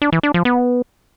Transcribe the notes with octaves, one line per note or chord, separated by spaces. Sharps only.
D4
E3
D4
F3
B3